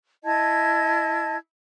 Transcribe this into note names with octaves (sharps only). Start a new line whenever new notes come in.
E4 D#5 A5 G#6